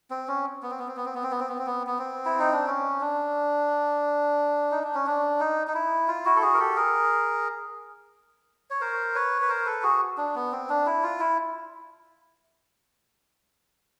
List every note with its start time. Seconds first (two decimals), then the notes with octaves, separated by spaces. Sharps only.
0.10 C4
0.28 C#4
0.63 B3
0.71 C4
0.79 B3
0.88 C4
0.97 B3
1.05 C4
1.15 B3
1.23 C4
1.31 B3
1.40 C4
1.49 B3
1.58 C4
1.67 B3
1.87 B3
1.99 C4
2.25 E4
2.40 D#4
2.53 D4
2.67 C#4
3.01 D4
4.71 D#4
4.84 D4
4.95 C#4
5.07 D4
5.40 D#4
5.67 D#4
5.75 E4
6.08 F4
6.25 E4 F#4
6.36 A4
6.42 F#4 G#4
6.54 A#4
6.59 G4 A4
6.76 G#4 A#4
8.70 C#5
8.81 A#4 C5
9.15 B4 C#5
9.42 B4
9.49 A#4 C5
9.66 A4 B4
9.83 F#4 G#4
10.18 D4
10.35 B3
10.52 C4
10.69 D4
10.86 E4
11.03 F4
11.20 E4